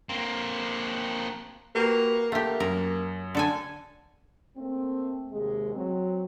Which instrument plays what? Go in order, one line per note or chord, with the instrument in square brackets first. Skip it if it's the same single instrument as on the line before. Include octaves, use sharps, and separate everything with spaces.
[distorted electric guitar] A#3 C4
[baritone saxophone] A#3 [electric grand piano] F#4 G4 B4
[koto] A3 G4 [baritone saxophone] A#3 [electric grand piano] A4 F5 F#5
[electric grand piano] F#2 [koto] A#4
[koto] D3 A4 G#5
[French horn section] A3 A#3 C4
D#2 C3 G#3
F#3 C4